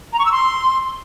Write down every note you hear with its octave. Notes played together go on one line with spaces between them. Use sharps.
A#5
C#6
E6
C6